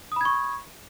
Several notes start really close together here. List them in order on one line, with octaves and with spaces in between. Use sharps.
D#6 B5 G#6 C#6